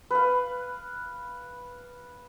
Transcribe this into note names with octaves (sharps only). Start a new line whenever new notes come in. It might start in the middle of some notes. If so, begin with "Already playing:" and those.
B4 F5